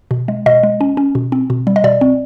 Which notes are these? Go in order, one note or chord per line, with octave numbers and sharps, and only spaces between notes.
B2
G#3
B2 D#5
G#3
C#4
C#4
B2
C4
B2
G3
D#5
B2 D5
C4